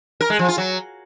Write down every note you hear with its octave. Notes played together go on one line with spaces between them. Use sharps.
A#4
G#3
F3
F4
F#3